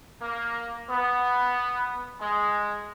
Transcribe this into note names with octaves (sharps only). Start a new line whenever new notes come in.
A#3
B3
G#3